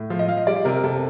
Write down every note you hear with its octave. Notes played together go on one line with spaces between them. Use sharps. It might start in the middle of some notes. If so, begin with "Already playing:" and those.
Already playing: A2
F3 F5
D#5
F3 F5
D#5
G3 D5
C3 A#4
A#4
C3 A4